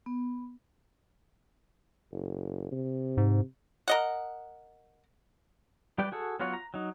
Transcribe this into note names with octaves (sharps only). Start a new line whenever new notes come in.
B3
F#1
C3
G#2
A#4 D#5 F#5
G3 G4 B4 D5 G5
F#4 G#4 A4
F#3 B3 F4 F#4 C#5
A#5
F#3 D#4